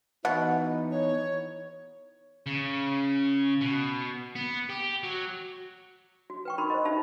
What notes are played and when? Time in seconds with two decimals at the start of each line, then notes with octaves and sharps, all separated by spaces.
0.25 B2 E3 B3 D#4 F#5
0.91 C#5
2.46 C#3
3.61 B2
4.36 B3
4.70 G4
5.04 F#3
6.30 F#4
6.45 B4 G5 C#6
6.58 D#4 F#4 A#4 B5 C6
6.70 C5 D#5
6.85 D#4 G4 D5 E5 A5 B5